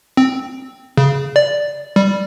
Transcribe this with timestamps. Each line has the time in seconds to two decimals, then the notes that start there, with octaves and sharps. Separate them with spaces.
0.17 C4
0.97 C#3
1.36 D5
1.96 G3